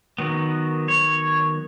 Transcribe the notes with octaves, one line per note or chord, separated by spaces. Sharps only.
D#3 F#3 B3
C#5